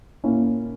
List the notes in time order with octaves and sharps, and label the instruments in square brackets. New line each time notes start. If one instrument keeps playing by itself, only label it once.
[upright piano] A#2 A#3 C#4 E4